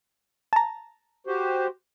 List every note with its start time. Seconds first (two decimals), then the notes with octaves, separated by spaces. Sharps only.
0.53 A5 A#5
1.27 F#4 G4 C5